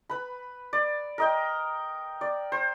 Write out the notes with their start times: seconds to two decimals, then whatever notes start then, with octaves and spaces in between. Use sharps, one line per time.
0.09 B4 B5
0.73 D5
1.18 A#4 D#5 G5
2.21 D5
2.52 C5